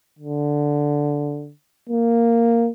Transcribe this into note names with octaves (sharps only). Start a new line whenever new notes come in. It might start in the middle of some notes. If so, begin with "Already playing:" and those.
D3
A#3